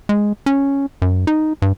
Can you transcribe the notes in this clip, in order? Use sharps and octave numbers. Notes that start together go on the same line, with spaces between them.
G#3
C#4
F#2
D#4
G2